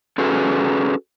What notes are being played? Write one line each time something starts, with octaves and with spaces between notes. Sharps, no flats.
C#4 F#4 G#4 A4 B4